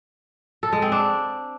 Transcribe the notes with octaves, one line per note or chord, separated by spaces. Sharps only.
A4
G#3
C4
D4